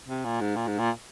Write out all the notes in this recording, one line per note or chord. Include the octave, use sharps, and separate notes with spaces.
C3
A#2
G#2
A#2
G#2
A#2